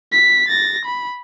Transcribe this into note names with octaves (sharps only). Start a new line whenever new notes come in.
B6
A6 A#6
B5